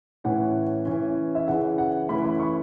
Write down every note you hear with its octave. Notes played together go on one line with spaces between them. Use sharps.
A2 E3 C#4 F#5
E3 C#4
E5
C#3 E3 C#4 F#5
F#5
E3 A3 C#4 B5
B5
C#6